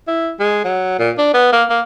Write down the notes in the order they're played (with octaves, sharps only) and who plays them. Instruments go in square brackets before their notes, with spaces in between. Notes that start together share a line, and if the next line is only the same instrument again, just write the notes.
[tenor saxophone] E4
G#3
F#3
A#2
D4
B3
A#3
A#3